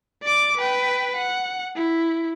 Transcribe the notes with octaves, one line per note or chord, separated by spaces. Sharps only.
D5 D6
B4 G5
F#5
E4